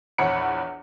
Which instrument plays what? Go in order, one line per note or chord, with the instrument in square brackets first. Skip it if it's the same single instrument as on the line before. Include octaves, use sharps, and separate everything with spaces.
[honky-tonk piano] A#1 E2 C#5 F#5 B5 C#7